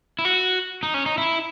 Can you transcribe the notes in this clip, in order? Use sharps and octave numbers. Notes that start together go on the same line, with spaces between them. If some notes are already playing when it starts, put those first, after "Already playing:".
E4
F#4
D#4
C#4
D#4
E4